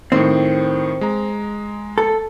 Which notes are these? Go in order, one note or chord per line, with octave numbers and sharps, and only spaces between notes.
A2 D#3 C4
G#3 A#5
A4